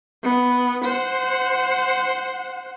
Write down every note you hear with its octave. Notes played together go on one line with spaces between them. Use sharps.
B3
C5 F#5